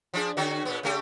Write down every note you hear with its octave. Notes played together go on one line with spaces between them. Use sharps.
F3 D4 G#4
D3 C#4 F#4
A#2 B3
C#3 A3 G4